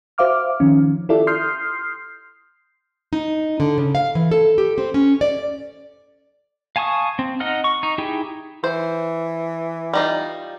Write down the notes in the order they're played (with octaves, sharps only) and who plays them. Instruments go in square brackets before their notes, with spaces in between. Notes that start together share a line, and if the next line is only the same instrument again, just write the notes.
[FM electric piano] F#4 C5 E5 F5 D6 F6
D#3 F3 C#4
E4 F4 G4 A4 D5 E5
C6 D#6 F6 G6 C7
[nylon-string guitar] D#4
D3
C#3
F5
E3
A4
G4
C4
C#4
D5
[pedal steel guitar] F5 G#5 A5 C#6 D#6
C4
D#4 D#5 F#5 F6
C#6
D#4
D#4 E4 G4 G#4 G5
[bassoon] E3 [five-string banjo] C5
[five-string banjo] G3 D#4 F4